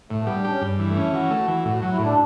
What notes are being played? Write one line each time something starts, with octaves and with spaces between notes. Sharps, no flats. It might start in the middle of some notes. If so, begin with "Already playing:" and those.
A2 A3
G3 B3
D4
C#4 G4
G2
E3
A3
C#4
E3 F#4
A3
E3
A2 F#4
F#3 F#4
E4
A2
D4